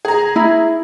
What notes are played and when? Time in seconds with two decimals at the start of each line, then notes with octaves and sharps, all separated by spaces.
0.05 G#4 A#5
0.36 E4